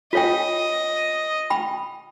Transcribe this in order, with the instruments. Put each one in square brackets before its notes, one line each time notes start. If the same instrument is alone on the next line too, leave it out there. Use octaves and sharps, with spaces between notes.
[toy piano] F4 C#5 G5 [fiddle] D#5
[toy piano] G5 B5